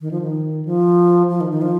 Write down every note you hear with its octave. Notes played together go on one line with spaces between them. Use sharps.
D#3
F3
D#3
F3
F3
D#3
D#3
F3